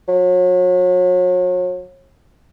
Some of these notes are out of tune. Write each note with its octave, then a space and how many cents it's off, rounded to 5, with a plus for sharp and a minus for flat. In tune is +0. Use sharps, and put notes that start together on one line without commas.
F#3 -35